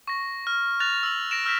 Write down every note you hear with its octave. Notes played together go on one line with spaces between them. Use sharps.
C#6 A#6
F6
F#6 A6 A#6 F7
E6 F#7
A#6 D7 E7
E6 F6 G6 A#6 B6 E7